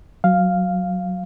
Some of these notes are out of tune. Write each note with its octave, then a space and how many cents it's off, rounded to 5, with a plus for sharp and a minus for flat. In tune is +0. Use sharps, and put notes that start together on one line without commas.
F#3 +0 F5 +0